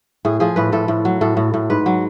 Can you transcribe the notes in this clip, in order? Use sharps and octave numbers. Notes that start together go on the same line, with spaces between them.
A2 G#4
F3 G#4
A2 B4
A2 A4
A2
F#3
A2 A4
A2
A2
G#2 B4
F#3